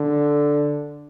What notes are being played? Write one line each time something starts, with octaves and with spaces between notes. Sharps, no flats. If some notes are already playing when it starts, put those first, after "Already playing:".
Already playing: D3